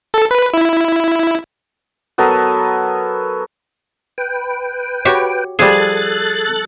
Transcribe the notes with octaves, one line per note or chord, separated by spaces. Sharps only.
A4
B4
E4
F#3 B3 A4 A#4
B4 G5
F#4 G4 C#5
F3 G3 G#4 A4 F#6 A6